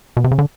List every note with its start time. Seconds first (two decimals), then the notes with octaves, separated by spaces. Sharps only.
0.17 B2
0.24 C3
0.31 C#3
0.39 D3